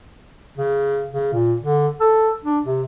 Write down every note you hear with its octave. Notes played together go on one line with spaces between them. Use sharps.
C#3
C#3
A#2
D3
A4
D4
C3